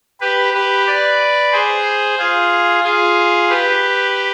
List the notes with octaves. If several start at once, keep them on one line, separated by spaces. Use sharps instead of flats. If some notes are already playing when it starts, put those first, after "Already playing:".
G4 B4
G4 B4
B4 D5
G#4 C5
F4 G#4
F4 G#4
G4 B4